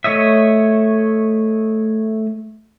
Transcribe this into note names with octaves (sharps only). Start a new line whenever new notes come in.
A3 C#5 D#5 E5